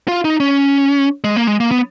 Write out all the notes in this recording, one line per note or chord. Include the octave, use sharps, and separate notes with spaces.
F4
D#4
C#4
G#3
A#3
G#3
A#3
B3